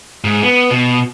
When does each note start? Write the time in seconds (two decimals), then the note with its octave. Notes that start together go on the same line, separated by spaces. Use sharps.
0.24 G#2
0.43 B3
0.70 B2